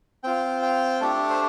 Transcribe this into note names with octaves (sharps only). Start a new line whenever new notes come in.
C4 F4 G5
G5
A3 D4 G4 A4
C5